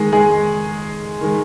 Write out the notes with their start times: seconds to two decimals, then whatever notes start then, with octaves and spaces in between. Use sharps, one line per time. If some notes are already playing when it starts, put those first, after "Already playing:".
Already playing: D#3 G#3 G#4
0.13 G#3 G#4
1.21 D#3 G#3